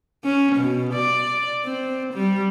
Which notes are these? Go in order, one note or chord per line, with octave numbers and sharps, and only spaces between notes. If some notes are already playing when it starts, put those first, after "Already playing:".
C#4
B2
D5
C4
G3